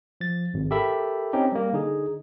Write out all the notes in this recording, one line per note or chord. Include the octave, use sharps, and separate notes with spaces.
F3 A6
G#1
G4 A4 A#4 E5 B5
C4 C#4 D#4 G4
G3 A#3
D3 D#4 G#4